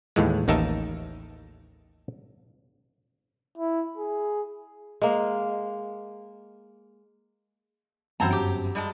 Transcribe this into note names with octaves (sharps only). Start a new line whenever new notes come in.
D#2 A2 E3 G#3
A1 D#2 D#4 A#4 E5 A5
E4
G#4
G#3 A#3
G1 F#2 E3 C4 C5 F#5 A5 A#5
G4
G3 G#3 A5